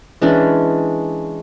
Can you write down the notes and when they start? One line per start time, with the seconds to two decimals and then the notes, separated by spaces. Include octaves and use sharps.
0.22 E3 G#3 C#4 D4